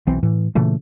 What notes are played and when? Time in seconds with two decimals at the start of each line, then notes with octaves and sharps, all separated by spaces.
0.07 B1 E3 C4
0.23 A2 E3
0.55 A#2 C#3 E3 A3